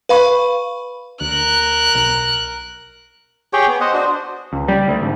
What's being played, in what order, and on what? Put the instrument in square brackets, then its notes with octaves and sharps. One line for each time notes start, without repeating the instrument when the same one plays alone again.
[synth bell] B4 F5 B5 C#6
[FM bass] D2 [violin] A#4 F#6
[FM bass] B1
[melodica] G4 G#4 C#5 G5
B3
C5 D#5 F#5
D4 F#4 C5
[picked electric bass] C#2
G3
D2
G#1